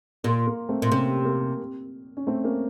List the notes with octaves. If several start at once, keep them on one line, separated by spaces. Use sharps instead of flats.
A#2 A#3
A#3
A3 C4
A#2
C3 A#3 C#4
A#3
C#4
A3 C4
A#3 C#4